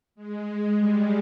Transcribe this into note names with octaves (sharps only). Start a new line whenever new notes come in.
G#3
G3